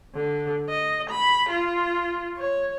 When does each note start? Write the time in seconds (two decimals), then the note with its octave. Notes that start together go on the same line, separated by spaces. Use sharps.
0.15 D3
0.69 D#5
1.10 B5
1.50 F4
2.38 C#5